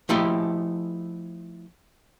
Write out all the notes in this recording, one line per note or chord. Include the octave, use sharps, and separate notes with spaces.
F3 A3 E4 G4 A4 D#5